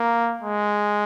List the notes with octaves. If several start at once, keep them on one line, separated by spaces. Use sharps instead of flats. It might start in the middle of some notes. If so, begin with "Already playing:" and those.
Already playing: A#3
G#3